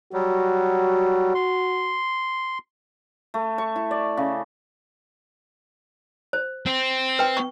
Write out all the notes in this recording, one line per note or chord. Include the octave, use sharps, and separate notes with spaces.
F#3 G3 F#4
C6
A3
C#6
E4
D5
C#3
C5
C4
B4 G5
C#6